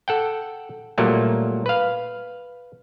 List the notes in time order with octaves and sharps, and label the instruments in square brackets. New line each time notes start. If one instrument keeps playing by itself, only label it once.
[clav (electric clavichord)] A4 F#5 G5
A#2 F#3 G3 A3 A#3
B4 F5